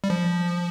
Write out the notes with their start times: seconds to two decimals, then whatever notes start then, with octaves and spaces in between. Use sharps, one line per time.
0.04 G3
0.10 F3